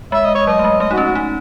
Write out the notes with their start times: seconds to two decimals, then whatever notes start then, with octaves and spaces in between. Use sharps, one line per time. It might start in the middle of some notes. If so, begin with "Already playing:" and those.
0.12 G#3 E5
0.25 D#5
0.35 C#5
0.47 F#3 D#5
0.59 A3
0.64 G#3
0.80 A3 D#5
0.91 D#4 F#4
0.97 C#4
1.04 F#4
1.15 D#4